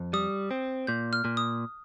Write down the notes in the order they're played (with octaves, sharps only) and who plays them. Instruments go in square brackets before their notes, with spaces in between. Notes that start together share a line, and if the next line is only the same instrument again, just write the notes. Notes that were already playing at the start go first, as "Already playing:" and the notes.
Already playing: [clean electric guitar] F2
[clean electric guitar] G3 [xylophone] D#6
[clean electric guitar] C4
[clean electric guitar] A#2 [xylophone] G6
[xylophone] F6
[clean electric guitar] A#2
[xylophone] D#6